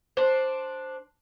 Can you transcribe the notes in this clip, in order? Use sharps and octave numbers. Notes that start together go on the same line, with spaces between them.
D4 C5